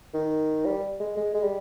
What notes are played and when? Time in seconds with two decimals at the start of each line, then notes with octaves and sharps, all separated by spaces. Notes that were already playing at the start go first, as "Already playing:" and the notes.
0.14 D#3
0.65 G3
1.00 G#3
1.17 G#3
1.34 G#3
1.43 G3